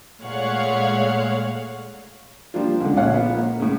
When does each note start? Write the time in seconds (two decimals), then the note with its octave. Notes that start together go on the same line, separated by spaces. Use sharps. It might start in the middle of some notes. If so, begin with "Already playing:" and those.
0.22 A#2 G#3 A3 C#5 F5 F#5
2.54 F3 G3 A#3 D4 F4
2.81 C#2 D3
2.96 A#1 A#2 C#5 F5 F#5
3.14 F3 B3
3.35 A#3
3.60 A2 C#3